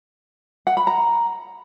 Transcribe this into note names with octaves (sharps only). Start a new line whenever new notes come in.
F#5
B5
A#5